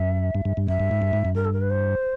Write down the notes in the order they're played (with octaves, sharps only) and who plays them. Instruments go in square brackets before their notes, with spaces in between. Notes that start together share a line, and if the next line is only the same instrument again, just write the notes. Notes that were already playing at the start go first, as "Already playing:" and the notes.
Already playing: [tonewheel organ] F#2 [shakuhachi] E5
[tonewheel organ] G2
G2
G2
[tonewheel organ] F#2 [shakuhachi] E5
[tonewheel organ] G2
G#2
G2
G#2
F#2
[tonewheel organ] G2 [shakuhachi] A#4
[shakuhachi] A4
A#4
B4
C5